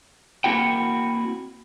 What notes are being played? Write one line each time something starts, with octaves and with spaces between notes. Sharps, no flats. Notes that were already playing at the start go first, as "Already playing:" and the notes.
A#3 C4 E4 F#4 G5